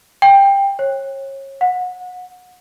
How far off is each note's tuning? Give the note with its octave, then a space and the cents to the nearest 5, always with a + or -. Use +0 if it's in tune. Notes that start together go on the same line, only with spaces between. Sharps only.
G5 +15
C#5 -30
F#5 -25